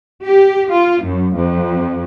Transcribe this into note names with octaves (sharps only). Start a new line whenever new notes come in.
G4
F4
F#2
F2